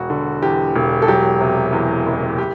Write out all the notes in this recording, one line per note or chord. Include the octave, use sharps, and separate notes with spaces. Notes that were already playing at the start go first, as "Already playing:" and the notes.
Already playing: E1 F#4
D3
E2 G4
E1
A4
F#3 G4
C3
E2
F#1
G4